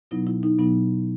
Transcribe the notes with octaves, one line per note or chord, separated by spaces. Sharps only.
B2 F#3 B3 D#4 E4
E4
D#4
B2 F#3 B3 D#4